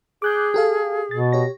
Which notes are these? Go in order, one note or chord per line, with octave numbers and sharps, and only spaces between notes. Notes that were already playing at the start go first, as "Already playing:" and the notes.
G#4 D6 F#6 G6
G4 A4 F5
B2 A6
G4 C#5 A#6